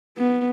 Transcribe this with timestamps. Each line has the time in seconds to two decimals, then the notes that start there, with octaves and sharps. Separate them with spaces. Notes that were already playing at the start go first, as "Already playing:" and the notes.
0.18 B3